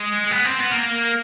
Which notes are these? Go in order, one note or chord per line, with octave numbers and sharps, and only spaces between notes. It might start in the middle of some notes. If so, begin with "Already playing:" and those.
Already playing: G#3
B3
C4
B3
A#3